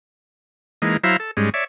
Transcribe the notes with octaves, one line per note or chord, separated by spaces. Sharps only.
E3 G#3 A#3 D#4
F#3 E4 C5 E5 F5 A#5
A4
G#2 G3 G#3 C#4
C#5 D5 E5